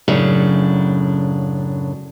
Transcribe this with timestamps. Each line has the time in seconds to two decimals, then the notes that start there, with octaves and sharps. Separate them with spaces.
0.08 F#2 A2 C#3 F#3 D4